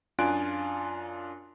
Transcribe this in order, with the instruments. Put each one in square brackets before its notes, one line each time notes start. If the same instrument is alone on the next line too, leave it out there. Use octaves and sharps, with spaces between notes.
[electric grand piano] F#2 D4 F4 G#5 F#6 D7